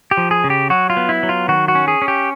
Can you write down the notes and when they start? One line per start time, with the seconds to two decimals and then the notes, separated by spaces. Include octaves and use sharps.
0.11 G4
0.17 F3
0.31 G#4
0.44 C#3
0.50 G4
0.70 F#3 F#4
0.90 F4
0.97 B3
1.09 E4
1.23 F#3
1.29 F4
1.48 D#3 F#4
1.68 F#4
1.75 C#4
1.88 G#4
2.02 C#4
2.08 G4